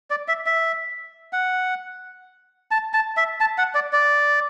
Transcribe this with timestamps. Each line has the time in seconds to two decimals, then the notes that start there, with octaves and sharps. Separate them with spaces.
0.10 D5
0.28 E5
0.46 E5
1.33 F#5
2.71 A5
2.94 A5
3.17 E5
3.40 A5
3.58 F#5
3.75 D5
3.93 D5